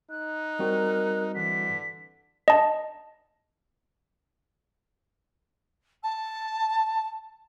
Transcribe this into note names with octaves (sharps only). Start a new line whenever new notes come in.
D#4 F#6
G3 C4 F#4 A#4
D3 E3 B6
D#5 A5
A5